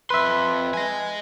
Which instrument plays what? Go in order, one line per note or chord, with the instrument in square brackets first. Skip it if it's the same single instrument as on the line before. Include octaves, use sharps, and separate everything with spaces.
[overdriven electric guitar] F2 C6 [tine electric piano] B4 E5
[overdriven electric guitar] D#5 G#5